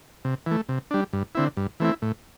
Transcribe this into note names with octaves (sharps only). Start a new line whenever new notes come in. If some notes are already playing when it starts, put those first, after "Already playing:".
C3
E3 A3
C3
G3 D4
G2
D3 C4 E4
G2
E3 A3 C4 E4
A2